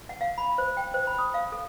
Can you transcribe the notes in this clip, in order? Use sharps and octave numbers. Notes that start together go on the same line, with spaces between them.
F#5
F5
B5
C5
G5
C5
B5
D#6
F5
A4